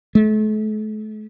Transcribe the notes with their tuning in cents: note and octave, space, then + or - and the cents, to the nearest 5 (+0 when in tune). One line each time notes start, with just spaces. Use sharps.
A3 -40